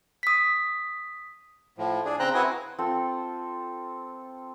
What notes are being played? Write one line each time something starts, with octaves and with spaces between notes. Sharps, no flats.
D#6 B6
A2 F3
D4 G#4
C#3 C4 C5 G5 A#5 F#6
C4 E4 F#4 B4 G#5 D#6
C4 F4 A4